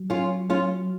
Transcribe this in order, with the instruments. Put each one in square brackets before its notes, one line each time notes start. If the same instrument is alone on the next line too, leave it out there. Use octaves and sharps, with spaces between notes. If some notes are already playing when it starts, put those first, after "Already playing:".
Already playing: [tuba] F#3
[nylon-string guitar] C#4 F4
C#4 F4